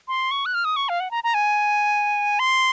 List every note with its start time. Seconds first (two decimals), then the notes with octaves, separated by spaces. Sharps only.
0.08 C6
0.31 C#6
0.46 F#6
0.54 F6
0.65 D#6
0.76 C#6
0.89 F5
1.00 F#5
1.11 A#5
1.24 A#5
1.34 G#5
2.39 C6